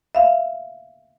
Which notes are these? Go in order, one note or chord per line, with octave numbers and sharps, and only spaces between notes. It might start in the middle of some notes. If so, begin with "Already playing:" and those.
E5 F5